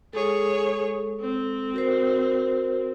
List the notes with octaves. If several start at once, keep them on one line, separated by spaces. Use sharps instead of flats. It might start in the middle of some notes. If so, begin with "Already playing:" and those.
G#3 G#4 A4 C#5
C4
F#4 A#4 C5